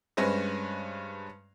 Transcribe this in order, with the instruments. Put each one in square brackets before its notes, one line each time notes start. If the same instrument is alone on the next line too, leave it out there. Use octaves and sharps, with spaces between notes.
[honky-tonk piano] G2 G#3 C#4 B4 C5 A#6